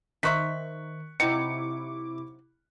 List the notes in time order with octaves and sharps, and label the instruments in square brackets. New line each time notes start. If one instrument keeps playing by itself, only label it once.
[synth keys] D#3 [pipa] D#4 C5 E5 [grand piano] C#6 F#6 B6
[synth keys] C3 E4 D6 [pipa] F#3 C4 D#4 [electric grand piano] C#7